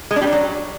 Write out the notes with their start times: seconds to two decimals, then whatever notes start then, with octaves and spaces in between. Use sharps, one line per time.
0.11 G#3
0.16 D4
0.22 G3
0.27 D4
0.32 F#3